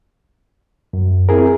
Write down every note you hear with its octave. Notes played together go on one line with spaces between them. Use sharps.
F#2
C4 E4 G#4 A#4